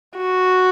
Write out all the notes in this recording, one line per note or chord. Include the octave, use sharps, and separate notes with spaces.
F#4